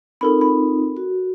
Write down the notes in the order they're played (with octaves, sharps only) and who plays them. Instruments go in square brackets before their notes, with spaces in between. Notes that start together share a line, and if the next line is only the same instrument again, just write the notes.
[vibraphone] C4 D#4 F4 [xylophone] A4 A#4 B5
[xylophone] B5
[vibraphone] F#4